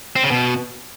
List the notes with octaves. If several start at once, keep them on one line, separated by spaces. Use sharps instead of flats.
C4
C#3
B2